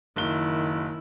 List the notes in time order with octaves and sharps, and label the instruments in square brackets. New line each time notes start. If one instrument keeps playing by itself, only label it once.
[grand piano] F#1 G7 [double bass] D#3 E4